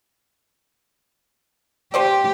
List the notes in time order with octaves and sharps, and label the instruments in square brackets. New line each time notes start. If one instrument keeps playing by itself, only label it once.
[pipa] F3 C5 D5 [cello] G4